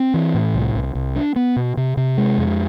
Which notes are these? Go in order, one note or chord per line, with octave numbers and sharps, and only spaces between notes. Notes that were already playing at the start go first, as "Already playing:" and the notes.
Already playing: C4
E3
A2
C2
C2
C2
D4
B3
B2
C3
C3
G#3
F2